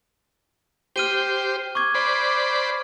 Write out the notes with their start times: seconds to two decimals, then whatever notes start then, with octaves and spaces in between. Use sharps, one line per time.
0.96 G4 C5 F6 D#7 G7
1.75 C#6 D6 G#6
1.95 C5 D5 B5